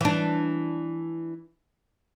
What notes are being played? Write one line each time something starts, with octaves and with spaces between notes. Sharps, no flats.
E3 D4